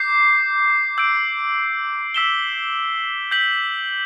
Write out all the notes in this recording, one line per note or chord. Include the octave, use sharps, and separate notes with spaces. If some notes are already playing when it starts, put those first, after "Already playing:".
Already playing: D6 G6 C7
E6 G6 D7
E6 B6 E7 G7
G6 B6 F#7